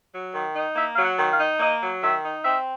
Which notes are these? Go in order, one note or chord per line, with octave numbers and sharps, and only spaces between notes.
F#3
D#3
D#4
A#3 E5
F#3 F5
F#5
D#3
F5
D#4
A#3 D#5
F#3
D#3 E5
D#4
C4 E5